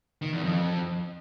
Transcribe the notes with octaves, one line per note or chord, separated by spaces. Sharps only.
D#3
E2
F2